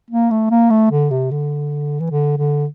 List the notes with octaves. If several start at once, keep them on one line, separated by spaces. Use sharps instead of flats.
A#3
A3
A#3
A3
D3
C3
D3
E3
D3
D3